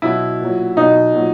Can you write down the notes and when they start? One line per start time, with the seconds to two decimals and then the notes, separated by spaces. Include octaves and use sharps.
0.02 B2 F#3 E4
0.40 A#2 F#3
0.77 B2 F#3 D#4
1.14 A#2 F#3